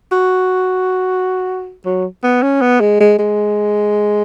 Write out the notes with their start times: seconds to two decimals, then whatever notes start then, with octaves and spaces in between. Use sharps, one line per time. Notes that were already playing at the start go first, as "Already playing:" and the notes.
0.12 F#4
1.85 F#3
2.23 B3
2.42 C#4
2.61 B3
2.81 G#3
3.00 G#3
3.19 G#3